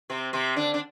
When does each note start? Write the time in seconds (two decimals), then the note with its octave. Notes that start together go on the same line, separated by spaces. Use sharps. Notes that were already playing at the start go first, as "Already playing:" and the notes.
0.10 C3 C4
0.33 C3 C4
0.56 D3 D4
0.74 D4